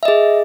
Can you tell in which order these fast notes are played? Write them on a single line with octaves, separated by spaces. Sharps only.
E5 D#5 G#4